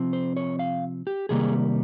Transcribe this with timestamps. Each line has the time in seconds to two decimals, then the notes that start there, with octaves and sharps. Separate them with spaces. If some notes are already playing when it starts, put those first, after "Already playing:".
Already playing: C3 F3 C4
0.13 C5
0.37 C#5
0.59 F5
1.07 G4
1.29 C3 D#3 G3 A#3 G#4